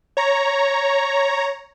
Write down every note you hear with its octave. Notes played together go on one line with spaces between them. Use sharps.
C#5 A#5